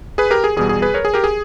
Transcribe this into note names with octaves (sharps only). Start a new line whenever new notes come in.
G#4 B4
G4 A#4
G#4
E2 B2 G3 G#4
G#4
G#4 B4
A#4 C#5
G#4
G4 A#4
G#4